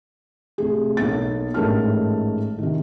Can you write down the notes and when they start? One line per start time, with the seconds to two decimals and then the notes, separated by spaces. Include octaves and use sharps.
0.58 C2 A3 G#4
0.97 B1 A#3 A6
1.54 A1 G#2 A3 A#4 A5 F6
2.59 C3 D#3